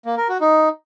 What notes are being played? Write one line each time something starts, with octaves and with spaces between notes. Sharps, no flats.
A#3
A#4
F#4
D#4